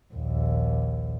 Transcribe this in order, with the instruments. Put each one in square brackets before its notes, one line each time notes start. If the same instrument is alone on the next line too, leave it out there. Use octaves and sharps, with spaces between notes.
[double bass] A#1 D#2